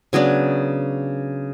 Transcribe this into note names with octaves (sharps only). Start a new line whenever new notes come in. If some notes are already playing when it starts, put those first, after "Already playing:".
C#3 F#3 B3 D4